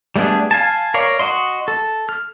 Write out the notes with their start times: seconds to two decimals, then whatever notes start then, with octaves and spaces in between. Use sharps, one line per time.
0.16 G3 A3 B3 D4 G#4
0.51 F5 G#5 A5
0.94 A#4 C#5 D5 F5
1.19 F#4 D#5 C6
1.68 A4
2.09 F6